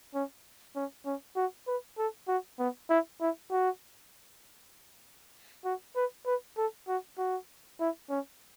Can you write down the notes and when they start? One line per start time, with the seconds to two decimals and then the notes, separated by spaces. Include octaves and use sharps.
0.14 C#4
0.76 C#4
1.05 C#4
1.36 F#4
1.67 B4
1.98 A4
2.28 F#4
2.59 B3
2.90 E4
3.21 E4
3.51 F#4
5.65 F#4
5.96 B4
6.26 B4
6.57 A4
6.88 F#4
7.18 F#4
7.80 E4
8.10 C#4